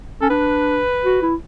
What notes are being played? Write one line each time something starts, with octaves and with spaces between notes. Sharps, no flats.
C#4 A4
D4 B4
F#4
E4